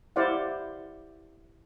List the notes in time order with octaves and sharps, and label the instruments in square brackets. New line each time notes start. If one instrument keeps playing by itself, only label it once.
[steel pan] E4 G4 C5 D5 F5 F#5